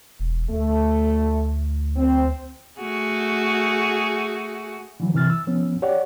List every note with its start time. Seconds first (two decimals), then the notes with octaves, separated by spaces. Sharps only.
0.20 E1
0.50 D2 A3
1.97 C4
2.80 A3 F#4 G#4
5.00 D3 E3 F#3
5.15 C3 E3 F6 A6
5.30 E6
5.47 F3 B3 C#4
5.82 G4 C#5 D5 F#5